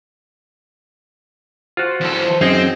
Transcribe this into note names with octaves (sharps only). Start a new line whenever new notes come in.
F4 F#4 C5
E2 A4
F#2 C4 D#4 G#4 F5